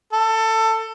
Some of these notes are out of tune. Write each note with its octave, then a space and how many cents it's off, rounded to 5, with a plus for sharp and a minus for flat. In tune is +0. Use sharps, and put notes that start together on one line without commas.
A4 +20